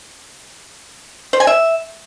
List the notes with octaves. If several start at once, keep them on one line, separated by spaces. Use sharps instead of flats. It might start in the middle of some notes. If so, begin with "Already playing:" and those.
C5
G#5
E5